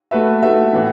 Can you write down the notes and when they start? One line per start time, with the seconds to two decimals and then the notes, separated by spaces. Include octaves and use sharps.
0.11 A3 F#4 B4 E5
0.42 A3 F#4 B4 E5
0.73 A2 E3 B3